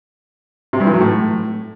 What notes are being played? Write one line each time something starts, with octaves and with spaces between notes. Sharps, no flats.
C3
G2
E3
F#3
A2